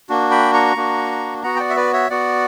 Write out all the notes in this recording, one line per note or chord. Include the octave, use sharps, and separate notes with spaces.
A#3 D4 F#4
G5 B5
A#5 C#6
A#3 D4 F#4
B3 F#4 F#5 A#5
G5
D5 F#5
E5
B4 D5
C#5 E5
B3 F#4 D5 F#5